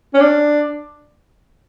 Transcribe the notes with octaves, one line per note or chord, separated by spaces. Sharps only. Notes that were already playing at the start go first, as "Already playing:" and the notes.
C#4
D4